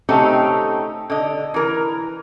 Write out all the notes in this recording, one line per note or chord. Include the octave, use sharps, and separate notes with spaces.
A3 C4 C#4 D#4 G4 A4
D3 D#5
E3 A#4